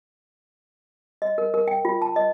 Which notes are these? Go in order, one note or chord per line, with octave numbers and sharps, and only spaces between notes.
D#5
A#4
A#4
G5
F4
A5
D#5